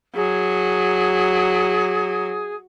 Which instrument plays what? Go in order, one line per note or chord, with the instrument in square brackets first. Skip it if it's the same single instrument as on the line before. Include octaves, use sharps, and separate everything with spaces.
[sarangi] F#3 [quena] G#4